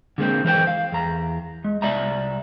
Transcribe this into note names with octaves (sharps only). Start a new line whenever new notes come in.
D3 G#3 A#3 C4
E3 A#4 C5 G5
F5
E2 A#5
G#3
C2 D5 E5 A#5